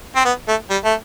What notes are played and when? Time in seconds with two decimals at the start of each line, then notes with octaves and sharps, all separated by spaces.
0.16 C4
0.25 B3
0.48 A3
0.70 G3
0.85 A3